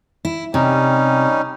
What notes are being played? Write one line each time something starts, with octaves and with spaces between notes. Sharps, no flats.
E4
C3 G3 C#4 D#4